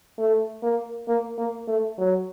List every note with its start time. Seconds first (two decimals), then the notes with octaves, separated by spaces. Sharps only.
0.18 A3
0.63 A#3
1.08 A#3
1.38 A#3
1.67 A3
1.98 F#3